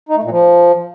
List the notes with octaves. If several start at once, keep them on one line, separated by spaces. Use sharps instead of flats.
D#4
A3
A#2
F3